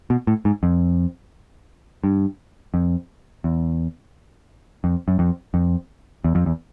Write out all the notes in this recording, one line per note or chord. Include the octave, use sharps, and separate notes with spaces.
B2
A2
G#2
F2
G2
F2
E2
F2
F#2
F2
F2
E2
F2
E2